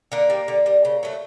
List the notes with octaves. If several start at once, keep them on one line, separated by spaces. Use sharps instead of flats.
D3 A#3
G3
D3
G3
C#3
F#3 A3